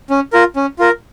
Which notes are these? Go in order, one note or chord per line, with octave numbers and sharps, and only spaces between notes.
C#4
F4 A#4
C#4
F4 A#4